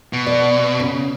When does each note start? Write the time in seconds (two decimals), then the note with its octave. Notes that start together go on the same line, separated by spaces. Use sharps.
0.13 B2
0.27 D5
0.80 C#3